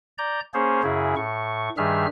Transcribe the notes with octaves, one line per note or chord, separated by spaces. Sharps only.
D5 A#5 G6
A#3 C#4 G#4 C5 C#5
F#2 C#3 E4 G#4
A2 C#6
G2 D#3 G3 G#4 E5 F6